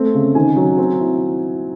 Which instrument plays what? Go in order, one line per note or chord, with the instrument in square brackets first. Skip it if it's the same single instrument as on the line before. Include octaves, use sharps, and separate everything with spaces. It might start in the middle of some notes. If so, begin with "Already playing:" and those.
Already playing: [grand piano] A3 C4
C#3
D#3 G#5
F#3
C4
E4